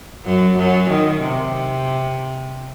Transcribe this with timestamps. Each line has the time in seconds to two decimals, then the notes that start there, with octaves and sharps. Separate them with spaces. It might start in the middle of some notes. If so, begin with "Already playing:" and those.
0.25 F#2 F#3
0.58 F#2 F#3
0.90 D#3
1.21 C3